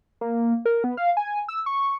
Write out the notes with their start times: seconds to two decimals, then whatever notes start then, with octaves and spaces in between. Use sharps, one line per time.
0.21 A#3
0.66 A#4
0.84 B3
0.97 F5
1.17 G#5
1.48 E6
1.66 C#6